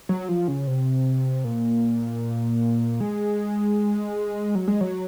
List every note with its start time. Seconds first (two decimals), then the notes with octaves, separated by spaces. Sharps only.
0.09 F#3
0.29 F3
0.48 C#3
0.67 C3
1.44 A#2
3.00 G#3
4.55 F#3
4.68 G#3
4.81 F#3